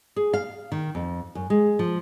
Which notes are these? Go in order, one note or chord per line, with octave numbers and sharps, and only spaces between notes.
G#4
F5
D#3
F2
F#2
G#3
F3